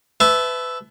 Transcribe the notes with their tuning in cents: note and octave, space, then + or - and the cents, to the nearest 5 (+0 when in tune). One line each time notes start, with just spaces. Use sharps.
B4 +25 E5 +0 A5 -20